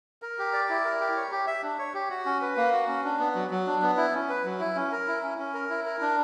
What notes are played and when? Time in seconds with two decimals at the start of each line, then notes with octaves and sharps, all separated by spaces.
0.22 A#4
0.39 G4
0.53 D5
0.69 E4
0.85 A#4
1.00 G4
1.16 C#5
1.31 G4
1.47 E5
1.63 D4
1.79 C#5
1.94 G4
2.10 F#4
2.26 C#4
2.41 B4
2.57 A#3
2.73 F#4
2.88 C#4
3.04 D4
3.20 B3
3.35 F#3
3.50 F#3
3.67 D4
3.82 B3
3.97 E4
4.14 C#4
4.29 B4
4.44 F#3
4.60 E4
4.76 C#4
4.92 A#4
5.07 E4
5.23 C#4
5.38 C#4
5.54 A#4
5.70 E4
5.86 A#4
6.01 D4